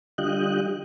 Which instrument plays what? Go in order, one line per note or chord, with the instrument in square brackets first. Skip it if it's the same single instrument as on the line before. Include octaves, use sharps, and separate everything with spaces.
[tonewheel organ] D3 G3 F4 D#5 G5 F#6